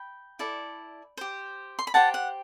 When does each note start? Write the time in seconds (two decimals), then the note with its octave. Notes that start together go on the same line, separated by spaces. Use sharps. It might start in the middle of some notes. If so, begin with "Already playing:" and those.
Already playing: G5 B5
0.39 E4 A4 D5
1.17 G4 C5
1.79 C6
1.87 B5
1.94 G4 C5 F#5 A5
2.14 F#5